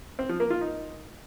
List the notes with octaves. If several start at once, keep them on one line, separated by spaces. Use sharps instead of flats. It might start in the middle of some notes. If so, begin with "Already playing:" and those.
C4
F3
A#3
F4
D#4